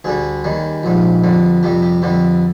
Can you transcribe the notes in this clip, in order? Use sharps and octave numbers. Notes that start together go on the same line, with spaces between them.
D2 D3 G3 G#4
D#2 D#3 G3
A#1 G#2 G3
F2 D3 G3
F2 C3 G3 G4
G4
F2 D3 G3 G4